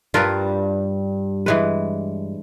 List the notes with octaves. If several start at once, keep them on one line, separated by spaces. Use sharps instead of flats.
G2 F4 A#4 B4
E3 G#3 B4